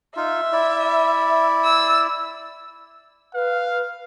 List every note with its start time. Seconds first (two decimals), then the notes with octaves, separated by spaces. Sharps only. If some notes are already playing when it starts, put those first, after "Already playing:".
0.16 D#4 F4 E5
0.52 E4 D5
1.64 E6
3.34 B4 F5